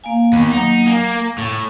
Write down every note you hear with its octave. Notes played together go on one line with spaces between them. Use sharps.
A#3 F5 G#5
D#2 B3
F#3 A#3 D#4
A#3 G#5
A2